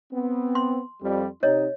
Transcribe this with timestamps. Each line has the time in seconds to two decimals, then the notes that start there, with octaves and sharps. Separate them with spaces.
0.12 B3 C4
0.55 C6
1.01 F2 G3
1.43 C3 D#4 C#5 D#5